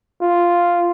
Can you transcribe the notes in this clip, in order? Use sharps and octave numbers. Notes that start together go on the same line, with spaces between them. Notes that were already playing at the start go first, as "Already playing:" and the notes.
F4